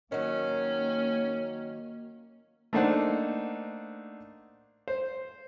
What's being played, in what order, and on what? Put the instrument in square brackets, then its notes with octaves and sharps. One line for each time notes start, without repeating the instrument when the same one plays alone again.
[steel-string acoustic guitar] D#3 F#3 [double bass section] A#3 [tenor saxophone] C#4
[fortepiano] A3 A#3 D4 D#4 C5 F#5
C5